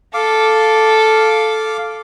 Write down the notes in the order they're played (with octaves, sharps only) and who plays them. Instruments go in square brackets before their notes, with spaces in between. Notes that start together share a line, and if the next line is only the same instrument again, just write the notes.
[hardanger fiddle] A4 [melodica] F5 D6